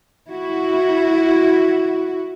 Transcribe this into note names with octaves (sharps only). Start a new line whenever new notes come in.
E4 F#4